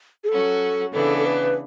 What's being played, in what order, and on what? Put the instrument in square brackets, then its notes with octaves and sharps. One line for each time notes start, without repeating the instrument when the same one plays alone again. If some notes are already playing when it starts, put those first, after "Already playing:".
[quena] G#4
[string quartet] F#3 C#4 F#4 [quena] A4
[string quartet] C#3 E3 B3 D4 [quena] A4
[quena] A4
B4